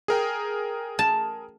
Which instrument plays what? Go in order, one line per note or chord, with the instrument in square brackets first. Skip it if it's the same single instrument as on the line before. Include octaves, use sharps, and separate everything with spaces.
[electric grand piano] G#4 A#4 G5
[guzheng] A5